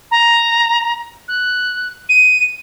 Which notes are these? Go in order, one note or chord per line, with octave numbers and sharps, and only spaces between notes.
A#5
F#6
D#7